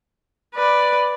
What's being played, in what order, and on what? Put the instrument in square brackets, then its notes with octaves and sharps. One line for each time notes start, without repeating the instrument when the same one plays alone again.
[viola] B4 D5